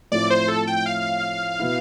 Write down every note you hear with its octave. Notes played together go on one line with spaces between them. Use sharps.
A2 F3 C4 E4 D5
C5
A4
G5
F5
B2 B3 E4